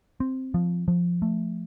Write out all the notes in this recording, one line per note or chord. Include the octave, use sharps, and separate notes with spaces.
C4
F3
F3
A3